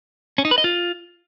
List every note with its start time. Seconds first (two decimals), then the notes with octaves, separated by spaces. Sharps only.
0.38 C#4
0.45 D#4
0.51 B4
0.58 D#5
0.64 F4